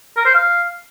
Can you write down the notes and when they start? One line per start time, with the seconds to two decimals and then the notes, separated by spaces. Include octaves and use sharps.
0.17 A#4
0.25 C5
0.34 F5